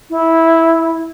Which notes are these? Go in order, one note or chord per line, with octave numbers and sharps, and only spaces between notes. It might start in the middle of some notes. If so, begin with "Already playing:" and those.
E4